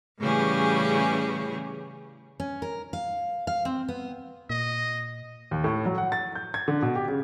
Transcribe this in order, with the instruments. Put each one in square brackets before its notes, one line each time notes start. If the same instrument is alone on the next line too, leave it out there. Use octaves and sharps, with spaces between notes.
[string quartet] A2 C#3 E3 G3 C#4 G#4
[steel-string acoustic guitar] C#4
A#4
F5
F5
C4
B3
[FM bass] A#2 [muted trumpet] D#5
[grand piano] D#2
A2
F#3
F#5
A6
G6
G#6
D3
B2
G4
C#3